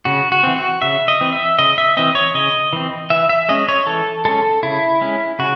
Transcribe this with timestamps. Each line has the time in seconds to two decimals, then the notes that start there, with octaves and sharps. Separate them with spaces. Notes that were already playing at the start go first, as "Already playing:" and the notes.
0.05 C#3 F#4
0.32 F#4
0.43 E3 C4
0.56 F#4
0.82 C#3 E5
1.08 D#5
1.21 E3 C4
1.33 E5
1.59 C#3 D#5
1.78 E5
1.97 E3 C4 D#5
2.15 C#5
2.34 C#3 D#5
2.73 E3 C4
3.10 E3 E5
3.29 E5
3.49 G#3 C#4 D#5
3.69 C#5
3.87 E3 A4
4.25 G#3 C#4 A4
4.63 C#3 E4
5.01 G#3 C#4
5.39 C#3 F#4